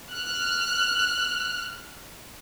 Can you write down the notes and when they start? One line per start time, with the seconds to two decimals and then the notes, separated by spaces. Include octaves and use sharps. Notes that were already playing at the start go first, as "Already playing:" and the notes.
0.12 F6 F#6